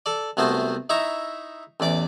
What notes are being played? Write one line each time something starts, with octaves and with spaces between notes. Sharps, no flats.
A4 D5
C2 F#3 A3 B3 C5
D#4 E4 E5 A#5 C#6
A1 E2 D5 D6